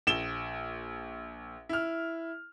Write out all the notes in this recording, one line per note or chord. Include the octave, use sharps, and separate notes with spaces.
A#1 E7 G7
E4 F6